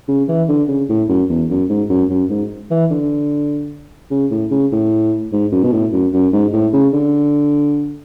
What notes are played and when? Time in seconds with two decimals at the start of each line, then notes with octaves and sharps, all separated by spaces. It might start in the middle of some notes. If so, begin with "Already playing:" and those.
0.08 C#3
0.28 E3
0.48 D3
0.68 C#3
0.89 A2
1.09 F#2
1.29 E2
1.49 F#2
1.69 G#2
1.90 F#2
2.10 F#2
2.29 G#2
2.70 E3
2.91 D3
4.11 C#3
4.31 A2
4.51 C#3
4.72 A2
5.32 G#2
5.52 F#2
5.63 B2
5.72 A2
5.93 F#2
6.13 F#2
6.33 G#2
6.53 A2
6.73 C#3
6.93 D3